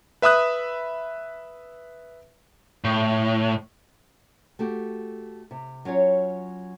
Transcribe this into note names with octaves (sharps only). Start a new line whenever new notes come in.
B4 E5 B5 D#6 F#6
A2
A3 F#4 G4
C3
F#3 C#4 F4 C#5